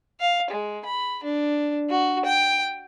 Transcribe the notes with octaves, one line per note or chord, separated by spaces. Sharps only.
F5
G#3
B5
D4
F#4
G5